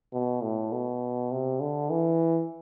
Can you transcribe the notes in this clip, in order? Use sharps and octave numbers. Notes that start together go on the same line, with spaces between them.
B2
A2
B2
C3
D3
E3